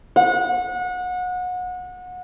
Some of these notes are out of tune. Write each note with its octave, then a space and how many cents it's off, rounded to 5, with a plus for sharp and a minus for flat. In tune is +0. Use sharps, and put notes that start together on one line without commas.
F#5 -30